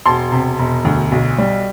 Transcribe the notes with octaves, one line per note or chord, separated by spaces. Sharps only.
E1 A5 C6
C3
E1
D2
B1
G3